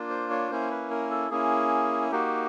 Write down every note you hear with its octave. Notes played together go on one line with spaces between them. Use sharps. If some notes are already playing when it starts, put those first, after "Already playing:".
Already playing: A#3 D4 F4
C5
C#5
A#3 C#4 E4 C5
B4
A#4
A4
A#3 C#4 E4 G#4
A#3 D#4 F#4 G4